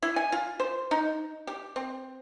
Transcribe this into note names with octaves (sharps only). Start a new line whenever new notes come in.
E4
G#5
F4
C5
D#4
G4
C4